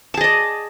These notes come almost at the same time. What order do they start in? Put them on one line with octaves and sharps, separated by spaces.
A5 G#4 D#5 D5